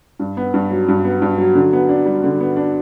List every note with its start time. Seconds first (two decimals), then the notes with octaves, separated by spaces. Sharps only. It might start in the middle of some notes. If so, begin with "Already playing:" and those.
0.19 G2
0.37 B3
0.54 G2
0.70 F#3
0.88 G2
1.05 B3
1.22 G2
1.38 F#3
1.55 D3
1.73 B3
1.89 D4
2.06 G3
2.24 D3
2.40 B3
2.56 D4